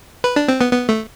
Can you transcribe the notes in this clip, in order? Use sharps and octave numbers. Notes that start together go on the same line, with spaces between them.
B4
D4
C4
B3
B3
A3